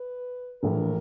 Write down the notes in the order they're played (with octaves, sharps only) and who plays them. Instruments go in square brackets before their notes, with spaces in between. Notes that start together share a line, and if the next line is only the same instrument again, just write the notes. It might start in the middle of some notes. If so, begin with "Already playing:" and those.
Already playing: [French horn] B4
[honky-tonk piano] A#1 A2 E3 [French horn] A#4